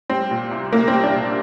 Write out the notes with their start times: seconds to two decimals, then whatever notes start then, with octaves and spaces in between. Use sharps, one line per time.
0.10 G3 C4
0.31 A#2
0.51 C2
0.72 C2 A#3
0.88 C4
0.93 G3
1.03 D4
1.14 A#2